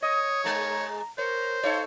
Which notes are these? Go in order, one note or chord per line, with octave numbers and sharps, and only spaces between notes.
C#5 D#5 D#6
G#2 G#3 A#5
A#4 C5 C#5
D#4 A4 C#5 F5